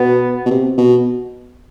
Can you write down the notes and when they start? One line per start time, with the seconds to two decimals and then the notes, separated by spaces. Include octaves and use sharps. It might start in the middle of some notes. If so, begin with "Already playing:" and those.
Already playing: B2 B3
0.46 B2
0.51 C3
0.78 B2